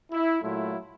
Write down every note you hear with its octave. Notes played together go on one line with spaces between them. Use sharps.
E4
A#2 F#3 A3 E4 F4